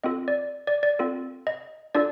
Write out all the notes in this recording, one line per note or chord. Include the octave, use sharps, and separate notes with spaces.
C4 F4 A4 D#5
D5
D5
D5
C4 F4 A4
D#5
D4 F4 A4 D5